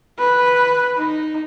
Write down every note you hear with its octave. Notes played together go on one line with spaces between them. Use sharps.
B4
D#4